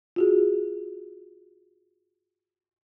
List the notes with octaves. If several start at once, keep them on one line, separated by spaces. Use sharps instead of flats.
F4 F#4 G#4